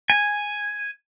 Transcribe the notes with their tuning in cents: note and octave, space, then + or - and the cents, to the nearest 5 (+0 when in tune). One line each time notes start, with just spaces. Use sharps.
G#5 -5